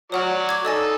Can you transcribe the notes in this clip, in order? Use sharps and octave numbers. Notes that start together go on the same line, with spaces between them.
F#3 F#4 C#5 D5 F#5 F6
D6 G#6
D#4 A4 D5 D#5 G#5